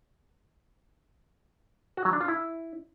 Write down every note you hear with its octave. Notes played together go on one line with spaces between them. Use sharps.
F#4
F#3
D4
F4
E4